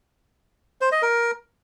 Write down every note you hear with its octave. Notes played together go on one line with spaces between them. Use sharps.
C5
D#5
A#4